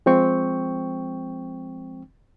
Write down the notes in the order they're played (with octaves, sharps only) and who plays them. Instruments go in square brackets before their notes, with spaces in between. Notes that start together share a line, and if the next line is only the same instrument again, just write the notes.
[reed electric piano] F3 G#3 C4 G5 C#6